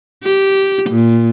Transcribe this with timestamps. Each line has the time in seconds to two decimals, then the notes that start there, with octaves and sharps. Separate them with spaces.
0.24 G4
0.90 A#2